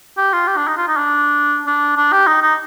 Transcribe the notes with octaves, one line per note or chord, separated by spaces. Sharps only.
G4
F4
G4
D4
D#4
F4
D#4
D4
D4
D4
G4
D#4
D#4